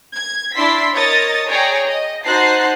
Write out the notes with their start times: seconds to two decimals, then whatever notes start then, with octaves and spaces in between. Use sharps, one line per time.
0.15 G#6
0.55 D4 E4 D5 C6 E6 B6
0.94 A#4 C#5 D#5 D#6 A6
1.48 G#4 C#5 D5 G5 A#5
1.87 D#5
2.25 D#4 F#4 C5 A5 F#6 C7